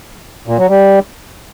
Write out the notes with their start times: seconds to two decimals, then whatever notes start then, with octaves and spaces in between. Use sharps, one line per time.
0.47 A#2
0.58 F#3
0.69 G3